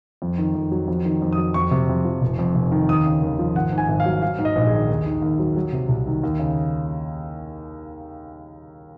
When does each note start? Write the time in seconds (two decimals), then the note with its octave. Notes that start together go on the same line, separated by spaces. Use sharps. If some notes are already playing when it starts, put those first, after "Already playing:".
0.22 F2
0.38 D#3
0.55 F2
0.72 F#3
0.88 F2
1.05 D#3
1.22 F2
1.33 D#6
1.38 F#3
1.54 F2 C#6
1.71 C3
1.89 F2
2.05 F3
2.21 F1
2.39 F2
2.55 F1
2.72 D#3
2.89 D#2 D#6
3.06 C#3
3.22 D#2
3.39 F3
3.55 G#1 F#5
3.72 G#2
3.78 G#5
3.88 G#1
4.00 F5
4.06 F#3
4.22 F#3 F5
4.39 G#2
4.45 D#5
4.56 A#1
4.67 G#4
4.73 D#3
4.89 D#2
5.06 D#3
5.22 D#2
5.39 F#3
5.56 F#3
5.73 C3
5.89 C2
6.07 D#3
6.23 D#2
6.39 C#3